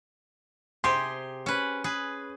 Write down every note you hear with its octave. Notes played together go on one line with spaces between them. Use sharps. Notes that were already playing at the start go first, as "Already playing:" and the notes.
C3 G4 G#4 C6
C#4 B4
G#4 B4